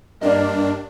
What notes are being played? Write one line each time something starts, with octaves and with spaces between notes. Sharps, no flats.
G2 A#3 D4 D5 D#5